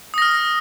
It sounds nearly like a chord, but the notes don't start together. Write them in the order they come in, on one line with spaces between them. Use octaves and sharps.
D#6 A#6 F6